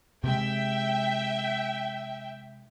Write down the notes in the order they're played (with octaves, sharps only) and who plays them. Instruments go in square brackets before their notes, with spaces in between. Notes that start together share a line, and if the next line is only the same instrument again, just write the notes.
[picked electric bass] C3 G#3 [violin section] E5 G5